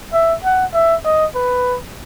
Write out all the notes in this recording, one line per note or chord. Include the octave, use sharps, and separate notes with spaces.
E5
F#5
E5
D#5
B4